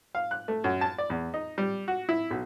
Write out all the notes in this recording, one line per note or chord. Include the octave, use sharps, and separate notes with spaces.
F5
F#6
A3
F#2
A5
D5
E2
D#4
G3
F#4
E4
B1